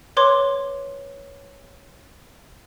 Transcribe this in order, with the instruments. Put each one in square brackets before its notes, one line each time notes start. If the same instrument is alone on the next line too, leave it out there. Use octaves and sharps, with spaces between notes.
[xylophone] B4 C#5 C6 D6 G#6